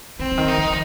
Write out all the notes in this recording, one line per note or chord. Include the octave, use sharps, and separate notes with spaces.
D3 C4
D3
D#3
D#4
F3